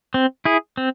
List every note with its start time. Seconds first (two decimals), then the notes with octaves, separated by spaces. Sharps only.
0.14 C4
0.45 E4 G#4
0.77 C4